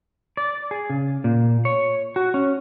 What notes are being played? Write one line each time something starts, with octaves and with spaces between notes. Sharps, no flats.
D5
G#4
C#3
A#2
C#5
F#4
C#4